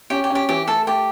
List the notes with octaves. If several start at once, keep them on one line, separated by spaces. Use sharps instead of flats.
C#4 G4
G4
C#4
G4
E3 G4
A3 A4
A3 G4